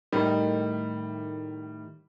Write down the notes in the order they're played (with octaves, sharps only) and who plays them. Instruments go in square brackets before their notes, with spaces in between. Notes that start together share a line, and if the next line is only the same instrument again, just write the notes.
[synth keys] A2 D#3 [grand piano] G3